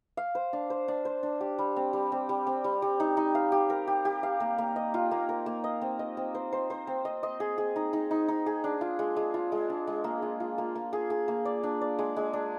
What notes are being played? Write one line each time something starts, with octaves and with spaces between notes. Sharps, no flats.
F5
C5
D4
C5
D4
C5
D4
G4
G3
C4
G3
C4
G3
C4
G3
G3
D#4
D#4
F5
G4
A#4
G4
G4
F5
A#3
A#3
D#5
F4
A#3
A#4
A#3
D#5
C4
D#5
C4
C5
C5
C5
C4
D#5
D#5
G#4
G#4
D#4
D#4
D#4
D#4
G#4
D4
F4
G#3
G#3
F4
G#3
D4
G#3
A#3
F4
F4
A#3
A#3
G#4
G#4
A#3
D5
D4
D5
G#3
G#3
D4